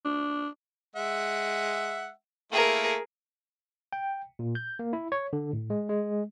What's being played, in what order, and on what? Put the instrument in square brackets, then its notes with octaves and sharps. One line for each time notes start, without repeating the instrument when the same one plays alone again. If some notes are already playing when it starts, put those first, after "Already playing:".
[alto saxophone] D4
[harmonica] G#3 E5 F#5
[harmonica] A3 A#3 E4 [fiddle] G#4 A#4
[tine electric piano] G5
A#2
G6
A#3
E4
C#5
D3
A2
G#3
G#3